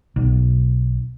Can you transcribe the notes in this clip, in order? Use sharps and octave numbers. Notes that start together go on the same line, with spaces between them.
B1